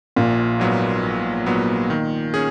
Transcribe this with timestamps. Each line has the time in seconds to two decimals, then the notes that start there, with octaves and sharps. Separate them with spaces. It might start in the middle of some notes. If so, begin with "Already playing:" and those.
0.16 A#1 A#2
0.59 G#2 F#3 B3
1.03 A#1
1.46 G#2 F#3 B3
1.90 D#3
2.34 C#4 G#4